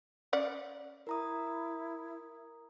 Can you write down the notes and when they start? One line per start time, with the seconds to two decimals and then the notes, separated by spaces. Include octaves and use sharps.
0.33 C#4 D5 F#5
1.07 E4 A#4 A#5 D#6